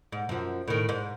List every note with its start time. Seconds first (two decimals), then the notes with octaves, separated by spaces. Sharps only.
0.12 G#2
0.29 F#2 F3
0.68 A2 D#3
0.89 G#2